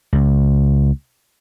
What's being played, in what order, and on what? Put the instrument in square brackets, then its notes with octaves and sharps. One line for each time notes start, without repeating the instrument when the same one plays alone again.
[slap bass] C#2